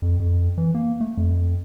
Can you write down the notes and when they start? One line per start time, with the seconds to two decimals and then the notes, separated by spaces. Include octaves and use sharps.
0.02 F2
0.20 F2
0.58 E3
0.74 A#3
1.01 A3
1.17 F2